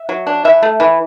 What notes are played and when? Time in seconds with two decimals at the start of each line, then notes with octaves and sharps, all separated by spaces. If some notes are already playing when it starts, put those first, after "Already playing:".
Already playing: E5
0.09 F#3
0.27 D4
0.44 E3 E5
0.63 A3
0.80 E3